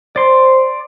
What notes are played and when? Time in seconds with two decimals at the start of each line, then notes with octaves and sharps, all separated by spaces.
0.16 C5 D5 C6